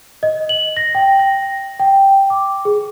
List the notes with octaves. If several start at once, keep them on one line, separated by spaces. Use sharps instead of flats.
D#5
F#7
A#6
G5
A#6
G5
D6
G#4